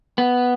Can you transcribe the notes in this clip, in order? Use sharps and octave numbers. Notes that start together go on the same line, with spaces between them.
B3